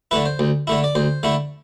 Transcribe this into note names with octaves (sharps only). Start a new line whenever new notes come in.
D3 A3 E4 B4
C5
D2
D3 A3 E4
D5
D2 C5
D3 A3 E4